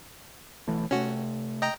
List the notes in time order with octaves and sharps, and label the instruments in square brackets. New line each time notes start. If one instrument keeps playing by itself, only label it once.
[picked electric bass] B1 E3 A3
[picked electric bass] C3 A3 [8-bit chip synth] C#4 F#4
[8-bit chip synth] D#5 G5 A#5